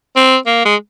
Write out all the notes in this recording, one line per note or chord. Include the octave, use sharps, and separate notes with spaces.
C4
A#3
G#3